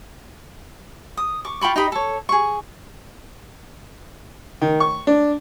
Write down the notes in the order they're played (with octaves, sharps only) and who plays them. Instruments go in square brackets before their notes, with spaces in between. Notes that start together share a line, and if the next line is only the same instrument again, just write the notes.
[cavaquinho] D#6
C#6 D6
F4 G5 B5 C#6
D#4 G4 D#5 B5
A4 C#5
G#4 C#6
[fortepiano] D#3
C#6
D4